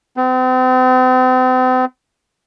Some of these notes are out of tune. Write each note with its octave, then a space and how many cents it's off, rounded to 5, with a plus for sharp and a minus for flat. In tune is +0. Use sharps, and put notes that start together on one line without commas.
C4 -40